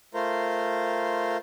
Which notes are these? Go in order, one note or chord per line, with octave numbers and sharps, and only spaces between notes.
A3 F4 A#4 C5